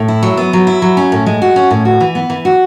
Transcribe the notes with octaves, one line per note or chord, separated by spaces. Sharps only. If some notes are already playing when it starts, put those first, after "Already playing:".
Already playing: A2
E4
F#3
B3
F#3
E4
F#3
C#4
A2
G#3
F#4
C#4
A2
F#4
E3
B3
E3
F#4